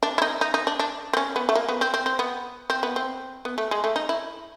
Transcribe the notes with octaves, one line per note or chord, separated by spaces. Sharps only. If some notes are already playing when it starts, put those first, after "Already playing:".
D4
E4
D#4
D#4
D#4
D4
D4
C4
C#4
B3
A3
A#3
B3
C4
C4
C4
B3
C4
B3
C4
B3
A3
G#3
A3
D#4
E4